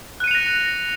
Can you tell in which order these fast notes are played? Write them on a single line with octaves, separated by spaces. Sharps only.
F#6 D#7 C#7 F7 A#6